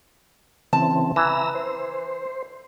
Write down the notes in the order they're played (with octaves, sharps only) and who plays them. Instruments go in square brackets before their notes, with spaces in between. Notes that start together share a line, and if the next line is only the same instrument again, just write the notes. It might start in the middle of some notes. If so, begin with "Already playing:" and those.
[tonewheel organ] C#3 E3 C4 [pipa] A5
[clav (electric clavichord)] E3 [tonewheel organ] E5 A#5 E6
[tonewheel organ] C5